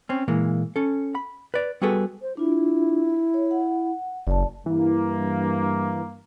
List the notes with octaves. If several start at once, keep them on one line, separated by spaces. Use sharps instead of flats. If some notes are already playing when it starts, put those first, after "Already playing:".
C4 C#4
A#2 E3 G#3 A#3
C#4 A4
B5
B4 D5
G3 B3 F#4 G#4 A4 B4
C5
D4 E4 F4
C#5
F#5
F#1 D5 A5
G2 E3 A#3